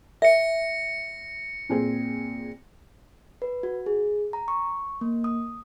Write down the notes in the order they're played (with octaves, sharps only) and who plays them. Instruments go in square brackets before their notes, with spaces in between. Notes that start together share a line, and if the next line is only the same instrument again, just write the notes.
[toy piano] E5 [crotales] A#6 C#7
[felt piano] A#2 C4 G#4
[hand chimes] B4
F#4
G#4
A#5
C#6
A#3
D#6